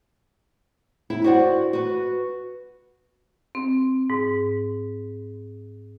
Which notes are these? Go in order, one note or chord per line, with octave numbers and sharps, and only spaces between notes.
E4
F#4 C5 D5 F#5
F#4 B4
C4
G#2